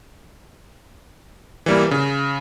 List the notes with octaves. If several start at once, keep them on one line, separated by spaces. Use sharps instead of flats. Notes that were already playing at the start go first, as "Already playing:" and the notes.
E3 G3 A#3
C#3